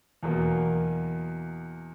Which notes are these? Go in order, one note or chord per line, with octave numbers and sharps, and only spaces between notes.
E2 B2 F#3 A#3